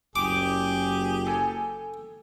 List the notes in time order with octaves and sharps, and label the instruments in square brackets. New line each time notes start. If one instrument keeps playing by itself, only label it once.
[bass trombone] F#1 [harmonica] G4 G#4 [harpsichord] D6
[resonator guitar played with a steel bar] A4 G#5